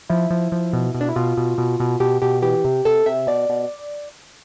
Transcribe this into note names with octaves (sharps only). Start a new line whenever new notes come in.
F3 E4
F3
F3
B2
B2
D4
E4
B2 F4
B2
B2
B2
B2 G4
B2 G4
E3 G4
C3
C3 A4
C3 E5
B2 D5
B2